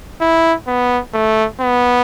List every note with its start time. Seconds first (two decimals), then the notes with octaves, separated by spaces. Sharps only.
0.21 E4
0.67 B3
1.14 A3
1.61 B3